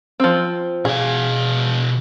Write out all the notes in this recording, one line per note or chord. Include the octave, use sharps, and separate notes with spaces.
F3 C4
B2 G#4 F5